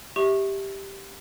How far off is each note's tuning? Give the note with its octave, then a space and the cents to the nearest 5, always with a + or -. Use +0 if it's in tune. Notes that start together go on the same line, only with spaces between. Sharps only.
G4 +0 E5 -20 C#6 -20